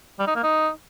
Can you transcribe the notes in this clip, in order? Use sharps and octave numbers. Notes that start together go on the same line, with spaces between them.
G3
D#4
A#3
D#4